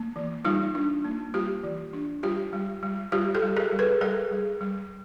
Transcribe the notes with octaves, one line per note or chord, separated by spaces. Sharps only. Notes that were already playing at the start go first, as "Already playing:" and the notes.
Already playing: A#3
E3
G3 D#4 F4
D4
A#3
G3 F4 G4
E3
D4
G3 F4 G4
G3
G3
G3 F4 G4
G4 A4
G3
G#4 A#4
G3
A4 B4
G3 G#4 A#4
G3
G3